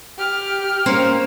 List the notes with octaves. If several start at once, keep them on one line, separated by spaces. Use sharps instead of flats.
G4 F6
A#3 C#4 C5